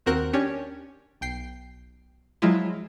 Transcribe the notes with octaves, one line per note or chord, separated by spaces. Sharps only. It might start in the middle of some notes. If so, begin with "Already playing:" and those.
D#2 C4 F#4 A#4 F#6
C#4 D4 G4 C#5
B1 G5 C7
F3 F#3 G#3 E4 F4